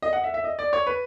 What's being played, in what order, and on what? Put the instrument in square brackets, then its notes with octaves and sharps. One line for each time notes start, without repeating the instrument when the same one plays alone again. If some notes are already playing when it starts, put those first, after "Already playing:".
[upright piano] D#5
F#5
E5
E5
D#5
D5
C#5
B4